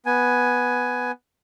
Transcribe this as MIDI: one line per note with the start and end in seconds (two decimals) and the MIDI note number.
0.06 1.11 59
0.06 1.11 80